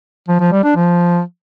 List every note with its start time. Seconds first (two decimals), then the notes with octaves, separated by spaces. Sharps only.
0.29 F3
0.40 F3
0.52 G3
0.64 D4
0.76 F3